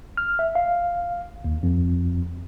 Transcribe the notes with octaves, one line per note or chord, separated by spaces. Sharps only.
F6
E5
F5
D#2
F2